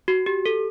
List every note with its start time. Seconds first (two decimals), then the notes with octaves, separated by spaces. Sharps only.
0.08 F#4
0.26 G4
0.46 A4